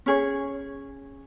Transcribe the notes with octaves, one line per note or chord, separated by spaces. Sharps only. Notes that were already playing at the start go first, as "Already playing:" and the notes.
C#4 G#4 C#5